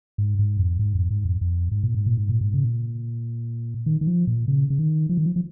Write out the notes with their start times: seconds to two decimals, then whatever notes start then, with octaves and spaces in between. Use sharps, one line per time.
0.18 G#2
0.39 G#2
0.59 F2
0.79 G#2
0.95 F2
1.10 G#2
1.25 F2
1.41 F2
1.71 G#2
1.83 A#2
1.94 G#2
2.06 A#2
2.17 G#2
2.29 A#2
2.41 G#2
2.54 C#3
2.64 A#2
3.86 D#3
4.01 D#3
4.07 F3
4.27 A#2
4.48 C#3
4.70 C#3
4.79 D#3
5.09 F3
5.17 D#3
5.26 F3
5.36 F3